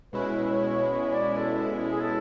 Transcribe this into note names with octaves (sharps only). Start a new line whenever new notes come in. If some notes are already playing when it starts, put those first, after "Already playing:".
B2 G#3 C#4 E4 B4
C#5
C#5
D5
A4
G#4
A4